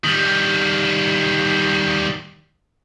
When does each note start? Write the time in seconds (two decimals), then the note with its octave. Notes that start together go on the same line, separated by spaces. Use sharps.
0.04 D#3 G3